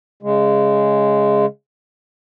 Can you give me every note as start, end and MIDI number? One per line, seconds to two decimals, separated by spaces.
0.23 1.46 49
0.23 1.46 56